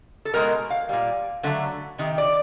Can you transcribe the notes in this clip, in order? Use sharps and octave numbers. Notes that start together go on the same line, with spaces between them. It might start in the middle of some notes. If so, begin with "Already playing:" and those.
A4
B2 G#3 A#4
F5
A#2 G3
D3 F#3 A3
C3 D#3
D5